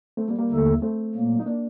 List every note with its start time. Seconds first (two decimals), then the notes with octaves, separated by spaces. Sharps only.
0.17 A3 C4
0.28 G3 A#3
0.39 G3 A#3
0.50 D#2 D3 A3 D#4 A4
0.82 A3 C4
1.14 A#2 F#3 A#3
1.39 D#4
1.46 A#3 D4